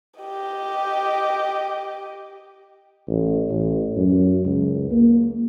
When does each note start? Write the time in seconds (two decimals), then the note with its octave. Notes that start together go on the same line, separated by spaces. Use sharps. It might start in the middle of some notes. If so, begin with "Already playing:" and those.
0.20 G4 D#5
3.08 A1
3.50 A1
3.96 F#2
4.45 C#2
4.91 A#3